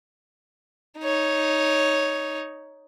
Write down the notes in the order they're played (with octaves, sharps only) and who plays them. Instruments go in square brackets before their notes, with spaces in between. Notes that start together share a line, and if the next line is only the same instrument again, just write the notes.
[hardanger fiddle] D#4 C#5